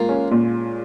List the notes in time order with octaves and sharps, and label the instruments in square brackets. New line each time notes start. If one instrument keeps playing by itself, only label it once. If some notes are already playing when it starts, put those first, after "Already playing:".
Already playing: [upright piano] G#3 F4 [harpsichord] A#3
[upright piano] C#4
A#2